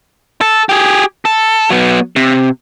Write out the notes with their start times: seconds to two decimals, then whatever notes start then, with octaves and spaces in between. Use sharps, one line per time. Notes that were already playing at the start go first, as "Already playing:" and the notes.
0.41 A4
0.69 G4 G#4
1.25 A4
1.70 F#3 B3
2.16 C3